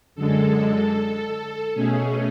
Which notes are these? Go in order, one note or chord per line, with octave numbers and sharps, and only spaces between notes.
F#2 D3 G#3 A4
B2 A3 C#4 G#4